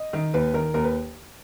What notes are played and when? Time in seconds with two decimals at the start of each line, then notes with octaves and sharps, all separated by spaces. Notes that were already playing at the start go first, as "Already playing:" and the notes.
Already playing: D#5
0.13 D#3
0.34 D#2 B4
0.54 D#3 A#4
0.74 D#2 A#4
0.84 B4